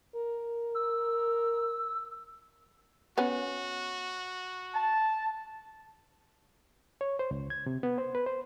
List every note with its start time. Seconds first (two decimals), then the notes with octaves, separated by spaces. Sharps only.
0.15 A#4
0.75 E6
3.18 B3 C#4 F#4
4.74 A5
7.01 C#5
7.19 C5
7.31 C#2
7.50 G#6
7.66 C3
7.83 B3
7.98 C5
8.15 B4
8.26 C5